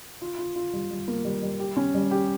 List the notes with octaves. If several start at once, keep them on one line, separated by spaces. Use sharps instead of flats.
F4
F4
F4
G3
G3
A#3
G3
G3
G4
C#4
G3
G4